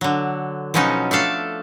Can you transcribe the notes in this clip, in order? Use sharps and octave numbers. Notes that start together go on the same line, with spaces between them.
D3 F#3
B2 F3 F#3 B3 C#4 D#4
A3 D4 A4 F5